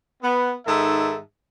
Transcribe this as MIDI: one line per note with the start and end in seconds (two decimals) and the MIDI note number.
0.23 0.52 59
0.67 1.18 44
0.67 1.18 51
0.67 1.18 69
0.67 1.18 76